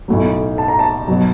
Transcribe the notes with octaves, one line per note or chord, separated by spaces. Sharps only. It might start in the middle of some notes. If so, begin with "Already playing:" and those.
B1 A2 F#3
A5
A#5
A5
B2 F#3